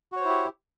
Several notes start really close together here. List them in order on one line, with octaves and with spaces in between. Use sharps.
F#4 C#5 C5 E4 G4